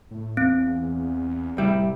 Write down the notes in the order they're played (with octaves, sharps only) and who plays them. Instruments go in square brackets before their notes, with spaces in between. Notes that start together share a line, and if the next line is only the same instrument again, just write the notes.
[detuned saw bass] A2
[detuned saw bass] E2 [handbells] C4
[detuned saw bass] D1 [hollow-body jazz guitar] C2 G3 E4